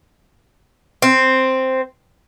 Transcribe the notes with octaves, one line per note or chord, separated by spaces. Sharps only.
C4